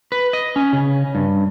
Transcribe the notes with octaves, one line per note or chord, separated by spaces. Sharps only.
B4
D#5
C#4
C#3
G2